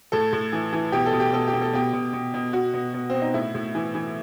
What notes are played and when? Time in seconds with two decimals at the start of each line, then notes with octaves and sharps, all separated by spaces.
0.12 A2 A4
0.33 A2
0.53 E3
0.73 E3
0.92 B2 G4
1.06 A4
1.13 B2
1.20 G4
1.33 B2 A4
1.48 G4
1.53 B2
1.62 A4
1.73 B2 G4
1.93 B2
2.13 B2
2.34 B2
2.53 B2 F#4
2.74 B2
2.94 B2
3.10 B2 C4
3.22 D#4
3.34 A2 E4
3.54 A2
3.75 E3
3.95 E3